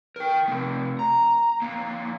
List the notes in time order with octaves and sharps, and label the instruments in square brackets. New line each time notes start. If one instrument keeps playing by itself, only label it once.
[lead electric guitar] A#4 G5
C3 A3
A#5
D3 A#3